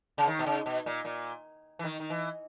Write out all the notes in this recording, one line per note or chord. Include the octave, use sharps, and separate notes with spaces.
C#3
D#3
B2
C#3
B2
A#2
A#2
E3
D#3
D#3
E3